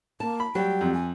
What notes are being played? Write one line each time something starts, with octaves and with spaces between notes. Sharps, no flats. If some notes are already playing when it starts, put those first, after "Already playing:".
A#3 A5
B5
F#3 G3 G4 G5
F2
G#5